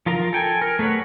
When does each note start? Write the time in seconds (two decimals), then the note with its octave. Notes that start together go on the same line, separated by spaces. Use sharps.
0.06 F3 F4 A#4 A#5
0.33 A4 G5 G#5
0.62 A#4
0.79 A3 G#4 B4 C#5 F#5